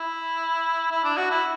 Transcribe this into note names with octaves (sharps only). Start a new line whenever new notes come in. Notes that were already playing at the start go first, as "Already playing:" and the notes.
Already playing: E4
E4
D4
F#4
E4